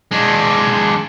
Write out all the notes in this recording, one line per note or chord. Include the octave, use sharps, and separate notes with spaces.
G#3 D4